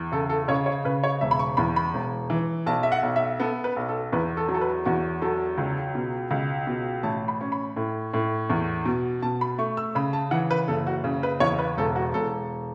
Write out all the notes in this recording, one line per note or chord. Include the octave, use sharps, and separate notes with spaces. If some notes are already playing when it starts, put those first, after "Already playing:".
Already playing: E2
C#3 A4
A4
C#3 C#5
C#5
C#3 B4
C#5
E1 E5
B5
C#6
E2 B5
B5
E1
E3
B1 A5
E5
F#5
B1
E5
B3 A4
B4
B1
A4
E2 B4
A4
F#3
A4
B4
E2 F#4
F#3 A4
C#2
B2
C#2
B2
A1 A5
B5
C#4
B5
A2
A2
E2
B2
B2 A5
B5
A3 C#6
E6
C#3 B5
A5
E3 F#5
B4
F#1 A4
F#4
C#3
B4
E2 C#5
B4
E1 A4
F#4
E1 A4